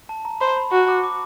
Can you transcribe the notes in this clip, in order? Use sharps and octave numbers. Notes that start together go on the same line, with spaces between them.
A5
A#5
C5 B5
B5
F#4
D6
D6